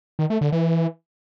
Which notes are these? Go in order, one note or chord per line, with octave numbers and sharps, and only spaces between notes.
D#3
A3
D3
E3